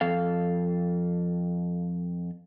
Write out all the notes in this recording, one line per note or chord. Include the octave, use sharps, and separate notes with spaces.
F2 A4 F5